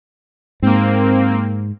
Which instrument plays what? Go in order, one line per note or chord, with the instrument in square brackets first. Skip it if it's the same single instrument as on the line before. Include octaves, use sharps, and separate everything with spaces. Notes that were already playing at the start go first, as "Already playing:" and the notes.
[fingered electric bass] G#2 [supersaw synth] A#3 C4